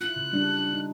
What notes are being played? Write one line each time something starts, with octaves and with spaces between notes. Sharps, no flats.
E4 F4 F#6
C#3
G3 D4
D#4